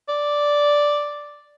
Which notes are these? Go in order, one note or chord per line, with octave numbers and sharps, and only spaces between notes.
D5